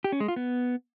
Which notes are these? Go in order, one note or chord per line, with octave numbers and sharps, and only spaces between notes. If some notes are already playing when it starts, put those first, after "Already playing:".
G4
C#4
G#3
F4
B3